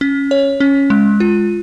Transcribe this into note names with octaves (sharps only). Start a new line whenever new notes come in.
C#4
C#5
C#4
G#3
F4